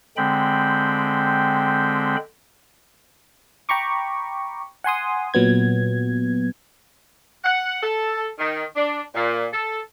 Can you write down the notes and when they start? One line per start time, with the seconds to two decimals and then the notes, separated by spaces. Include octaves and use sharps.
0.17 D3 G#3 C4 G5 B5
3.69 G5 A#5 B5 C#6 D6
4.84 F#5 G#5 C6 D#6
5.34 A#2 F#3 B3 G#6
7.44 F#5
7.82 A4
8.39 D#3
8.75 D4
9.14 A#2
9.52 A4